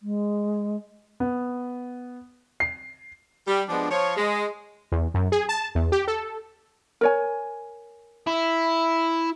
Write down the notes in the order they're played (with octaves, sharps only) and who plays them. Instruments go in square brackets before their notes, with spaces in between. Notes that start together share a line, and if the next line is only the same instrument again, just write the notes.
[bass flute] G#3
[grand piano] B3
C7
[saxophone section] G3
F3 G#3 B3 D4
F3 C#5
G#3
[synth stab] E2
F#2
G#4
A5
E2
G4
A4
[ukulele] A#4 C#5 G#5
[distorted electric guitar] E4